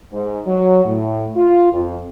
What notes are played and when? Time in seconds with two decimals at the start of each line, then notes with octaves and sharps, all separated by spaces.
0.12 G#2
0.46 F#3
0.85 A2
1.36 F4
1.72 F2